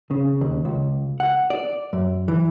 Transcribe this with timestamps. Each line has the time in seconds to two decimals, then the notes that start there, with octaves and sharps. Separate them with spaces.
0.11 C#3
0.41 D#2
0.65 C#2
1.20 F#5
1.50 D5
1.93 F#2
2.28 E3